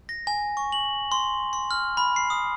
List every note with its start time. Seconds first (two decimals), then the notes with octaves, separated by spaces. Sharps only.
0.09 A#6
0.27 G#5
0.57 C#6
0.72 F#7
1.12 C6
1.53 C6
1.71 F6
1.97 B5
2.16 C7
2.30 D#6